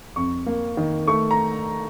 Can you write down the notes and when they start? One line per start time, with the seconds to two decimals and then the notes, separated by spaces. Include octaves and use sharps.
0.16 F2 C#6
0.46 A#3
0.77 D#3
1.08 A3 C#6
1.31 A#5